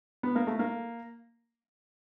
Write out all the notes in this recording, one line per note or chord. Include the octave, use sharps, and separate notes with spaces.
B3
A#3
A3
A#3